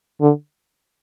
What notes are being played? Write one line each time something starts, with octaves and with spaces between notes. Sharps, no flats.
D3